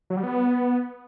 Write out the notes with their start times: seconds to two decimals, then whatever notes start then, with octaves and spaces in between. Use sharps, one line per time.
0.10 F#3
0.17 G3
0.23 B3